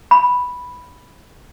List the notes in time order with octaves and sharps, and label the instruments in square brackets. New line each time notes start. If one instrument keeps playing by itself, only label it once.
[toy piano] B5